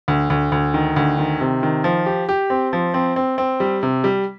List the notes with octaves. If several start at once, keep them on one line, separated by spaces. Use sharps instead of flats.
D2
D2
D2
D#3
D2
D#3
C3
D#3
F3
G4
G4
C4
F3
C4
C4
C4
G3
C3
G3